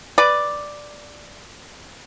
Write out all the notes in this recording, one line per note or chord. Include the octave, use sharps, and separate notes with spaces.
B4 D5